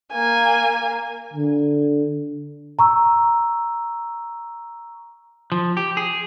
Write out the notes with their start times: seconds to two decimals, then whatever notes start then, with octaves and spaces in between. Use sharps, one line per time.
0.12 A#3 G#5
1.34 D3
2.79 A#5 C#6 E6
5.52 F3
5.77 G4
5.97 G#4